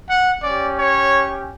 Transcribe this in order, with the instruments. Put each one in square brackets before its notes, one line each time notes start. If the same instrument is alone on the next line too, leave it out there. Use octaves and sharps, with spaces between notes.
[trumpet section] F#5
C#4 G4 D5
C#5